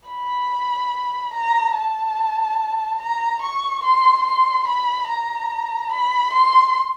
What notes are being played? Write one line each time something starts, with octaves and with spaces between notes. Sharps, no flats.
B5
A#5
A5
A#5
C#6
C6
C6
B5
A#5
B5
C6